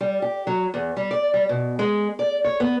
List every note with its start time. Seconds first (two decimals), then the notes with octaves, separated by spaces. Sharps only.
0.01 G3
0.22 G4
0.47 F#3
0.74 E2
0.97 G3
1.11 D5
1.34 G3
1.49 B2
1.79 G#3
2.19 D5
2.44 C#5
2.60 B3